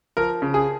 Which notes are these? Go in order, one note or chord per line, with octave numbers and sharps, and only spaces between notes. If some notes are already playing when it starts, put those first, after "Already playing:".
F3 A#4
C#3
G#4